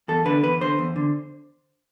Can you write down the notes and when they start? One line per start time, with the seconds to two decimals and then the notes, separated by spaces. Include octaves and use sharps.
0.08 E2 A4
0.26 D3 B4
0.43 E2 B4
0.61 D3 C5
0.79 E2
0.96 D3